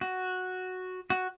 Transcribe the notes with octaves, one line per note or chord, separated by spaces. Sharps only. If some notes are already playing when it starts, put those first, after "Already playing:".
F#4
F#4